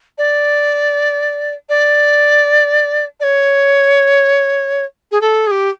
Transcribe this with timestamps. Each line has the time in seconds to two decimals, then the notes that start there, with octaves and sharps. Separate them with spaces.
0.18 D5
1.69 D5
3.20 D5
3.23 C#5
5.11 G#4
5.21 A4
5.47 G#4
5.51 G4